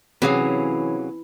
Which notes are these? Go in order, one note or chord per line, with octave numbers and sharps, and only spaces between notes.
C3 E3 F#3 C#4 G#4 F5